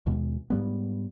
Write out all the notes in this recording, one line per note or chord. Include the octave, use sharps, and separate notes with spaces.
D#2 B2 G#3
G#2 G3 B3